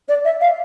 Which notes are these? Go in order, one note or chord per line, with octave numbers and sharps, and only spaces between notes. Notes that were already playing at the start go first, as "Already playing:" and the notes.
D5
E5
F5